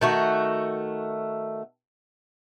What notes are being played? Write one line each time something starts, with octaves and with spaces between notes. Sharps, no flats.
D#3 A3 F#4